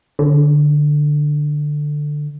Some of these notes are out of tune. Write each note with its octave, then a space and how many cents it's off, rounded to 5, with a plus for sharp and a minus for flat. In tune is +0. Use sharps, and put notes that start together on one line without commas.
D3 +10